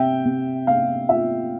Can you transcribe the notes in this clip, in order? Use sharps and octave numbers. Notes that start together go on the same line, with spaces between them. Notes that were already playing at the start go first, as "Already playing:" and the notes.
Already playing: C3 E5 G5
C3
C3 F5
F4 E5